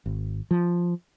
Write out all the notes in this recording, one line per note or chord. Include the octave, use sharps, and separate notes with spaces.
G#1
F3